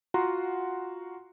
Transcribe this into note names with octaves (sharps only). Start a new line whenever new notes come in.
F4 F#4 F#5 A#5 C6